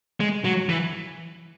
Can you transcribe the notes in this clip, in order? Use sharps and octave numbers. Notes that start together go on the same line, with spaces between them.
G#3
F#3
E3